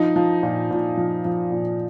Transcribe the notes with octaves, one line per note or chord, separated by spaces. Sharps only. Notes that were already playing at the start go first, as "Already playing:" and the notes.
Already playing: F3 D#4
F3
A#2
A#2
F3
F3
A#2